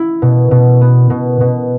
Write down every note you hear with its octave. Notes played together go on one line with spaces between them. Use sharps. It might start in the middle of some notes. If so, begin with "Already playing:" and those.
Already playing: E4
B2
B2
B3
B2
B2